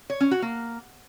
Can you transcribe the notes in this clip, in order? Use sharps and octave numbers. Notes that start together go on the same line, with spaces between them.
C#5
C#4
F#4
A#3